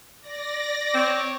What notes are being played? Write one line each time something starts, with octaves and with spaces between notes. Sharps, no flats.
D5 A#6
C4 C#5 D6